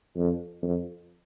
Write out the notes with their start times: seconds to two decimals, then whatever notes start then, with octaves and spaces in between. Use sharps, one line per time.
0.17 F2
0.62 F2